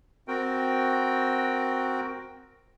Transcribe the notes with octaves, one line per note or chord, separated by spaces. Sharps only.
C4 F#4 A#4 G5